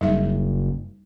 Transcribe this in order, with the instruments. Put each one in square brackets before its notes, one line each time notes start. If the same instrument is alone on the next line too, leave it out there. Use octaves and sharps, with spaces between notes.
[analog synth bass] F#1 [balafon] G3 D#4 E5